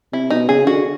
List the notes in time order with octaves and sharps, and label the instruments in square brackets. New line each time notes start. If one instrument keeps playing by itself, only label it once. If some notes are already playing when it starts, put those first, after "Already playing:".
[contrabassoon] C3 [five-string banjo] E4
[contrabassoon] B2 [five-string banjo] D#4
[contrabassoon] C#3 [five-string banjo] G#4
[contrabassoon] D3 [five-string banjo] F#4